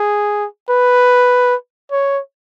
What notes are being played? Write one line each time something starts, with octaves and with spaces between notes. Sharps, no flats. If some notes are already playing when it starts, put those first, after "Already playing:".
Already playing: G#4
B4
C#5